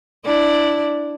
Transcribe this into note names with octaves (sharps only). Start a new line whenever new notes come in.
D4 E4 D5